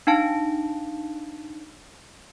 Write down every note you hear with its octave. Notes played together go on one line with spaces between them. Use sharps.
D4 D#4 F5 A5